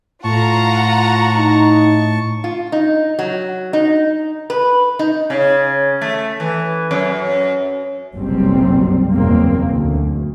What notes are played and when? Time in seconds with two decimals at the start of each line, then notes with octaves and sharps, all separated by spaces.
0.24 A2 F4 F#5 A5 A#5 C#6
1.36 D#4
2.44 F4
2.72 D#4
3.19 F#3
3.73 D#4
4.50 B4
4.99 D#4
5.30 C#3
6.01 A3
6.40 E3
6.91 F#2
8.14 F#1 B1 F#2 C3 G3 C4
9.12 F#1 E2 B2 A#3 C4
9.70 D2